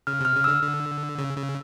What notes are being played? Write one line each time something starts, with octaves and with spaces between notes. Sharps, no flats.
C#3 F6
C3 F6
C#3
D3 E6
D3
C#3
C#3